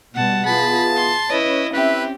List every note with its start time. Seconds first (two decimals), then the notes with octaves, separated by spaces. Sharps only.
0.14 B2 G3 F#5 A5
0.46 E3 B3 F4 G#4 A5 B5
0.97 C6
1.30 C#4 E4 B4 C#5 D#5
1.73 C4 E4 G4 B4 E5